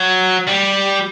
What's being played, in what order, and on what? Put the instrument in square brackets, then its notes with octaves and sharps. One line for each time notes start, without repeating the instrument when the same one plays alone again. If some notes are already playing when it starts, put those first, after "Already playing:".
Already playing: [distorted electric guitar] F#3
G3